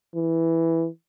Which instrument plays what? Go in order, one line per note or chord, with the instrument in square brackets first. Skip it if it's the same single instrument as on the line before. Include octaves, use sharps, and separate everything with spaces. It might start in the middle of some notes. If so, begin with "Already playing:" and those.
[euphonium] E3